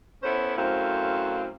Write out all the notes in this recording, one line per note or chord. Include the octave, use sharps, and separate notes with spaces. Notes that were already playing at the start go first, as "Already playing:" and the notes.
B3 C#4 E4 A4 C5
F#2 A2 C4 C5 F5